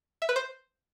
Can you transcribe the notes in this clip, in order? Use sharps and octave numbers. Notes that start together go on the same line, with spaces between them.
E5
B4
C5